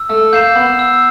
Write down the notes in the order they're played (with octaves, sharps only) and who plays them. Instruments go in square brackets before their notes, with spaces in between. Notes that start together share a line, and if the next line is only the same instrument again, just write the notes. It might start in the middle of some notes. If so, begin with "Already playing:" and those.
Already playing: [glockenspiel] E6
[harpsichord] A3
[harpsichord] A#3 [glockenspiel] G6 C7 E7
[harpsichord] B3
[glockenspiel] E6